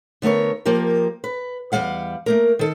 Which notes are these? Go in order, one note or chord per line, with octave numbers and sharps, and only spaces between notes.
D3 A3 B3 A#4 C#5
F3 A#3 G4 A#4
B4
E2 G3 G#3 F5 F#5
A3 A#3 A#4
D#3 A4